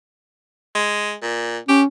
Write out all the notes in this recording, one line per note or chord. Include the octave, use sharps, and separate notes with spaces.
G#3
A#2
C#4 G4